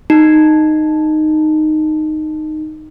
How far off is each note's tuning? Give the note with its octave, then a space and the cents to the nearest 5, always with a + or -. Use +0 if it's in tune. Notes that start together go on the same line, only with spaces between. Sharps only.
D#4 -10